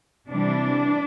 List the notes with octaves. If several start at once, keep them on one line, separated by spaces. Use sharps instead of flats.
C3 E3 G3 D4